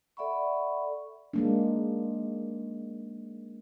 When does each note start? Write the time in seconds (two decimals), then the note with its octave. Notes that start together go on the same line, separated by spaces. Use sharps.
0.17 A4 D5 E5 F#5 B5 C#6
1.33 G#3 A#3 D4